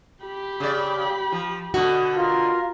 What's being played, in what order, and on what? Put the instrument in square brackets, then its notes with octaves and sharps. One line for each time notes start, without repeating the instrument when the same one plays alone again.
[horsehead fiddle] G4 B5
[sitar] C#3 D5
F3
[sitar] B2 D3 [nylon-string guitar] F#4
[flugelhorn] F4 [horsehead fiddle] A#4